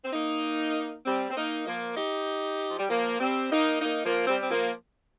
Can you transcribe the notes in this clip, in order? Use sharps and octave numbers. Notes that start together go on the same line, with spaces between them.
C4
A#3 D#4
G3 C4
C4
A#3 D#4
F3 A#3
D#4 G4
F3
G3
F3 A#3
G3 C4
A#3 D#4
A#3 D#4
F3 A#3
G3 C4
C4
F3 A#3